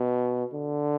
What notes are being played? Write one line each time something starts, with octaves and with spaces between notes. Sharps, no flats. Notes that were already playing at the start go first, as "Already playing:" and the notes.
Already playing: B2
D3